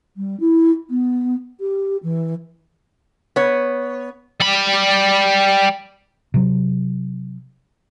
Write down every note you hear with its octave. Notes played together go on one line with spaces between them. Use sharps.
G3
E4
B3
G4
E3
B3 C#5
G3 B5
C3 F#3